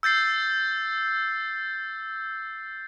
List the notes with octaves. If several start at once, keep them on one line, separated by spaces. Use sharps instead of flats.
E6 G6 A6 C7